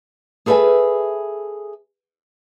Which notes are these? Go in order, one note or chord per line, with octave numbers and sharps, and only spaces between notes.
G#4 A4 B4 D5 E5 G#5